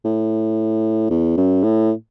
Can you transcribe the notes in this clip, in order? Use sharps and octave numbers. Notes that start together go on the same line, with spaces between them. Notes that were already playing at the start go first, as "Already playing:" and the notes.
A2
E2
F#2
A2